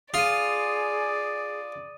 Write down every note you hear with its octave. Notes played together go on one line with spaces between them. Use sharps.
F4 G#4 D5 D#6 D#7